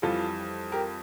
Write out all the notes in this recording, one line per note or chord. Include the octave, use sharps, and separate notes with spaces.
F2 E3 G3 F4 A4
G4 A#4